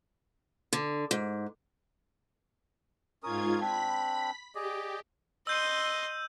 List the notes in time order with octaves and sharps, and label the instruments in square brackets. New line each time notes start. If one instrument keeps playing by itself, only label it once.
[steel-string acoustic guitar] D3
G#2
[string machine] G#2 F4 G#6 [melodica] C#4 A#4 D#6
[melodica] C4 D4 [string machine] B5 B6
[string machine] G4 [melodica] G#4 D5 D#5
[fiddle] D#5 C6 [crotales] E6 G6 D#7